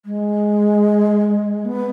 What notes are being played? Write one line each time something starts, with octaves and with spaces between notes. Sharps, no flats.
G#3
B3